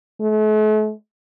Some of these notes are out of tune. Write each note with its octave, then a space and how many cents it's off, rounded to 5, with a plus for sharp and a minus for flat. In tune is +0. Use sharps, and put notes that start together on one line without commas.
A3 -45